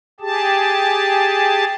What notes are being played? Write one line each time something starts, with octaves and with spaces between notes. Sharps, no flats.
G4 G#4 A5